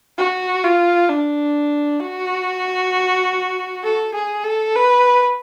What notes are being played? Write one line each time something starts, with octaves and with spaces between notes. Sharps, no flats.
F#4
F4
D4
F#4
A4
G#4
A4
B4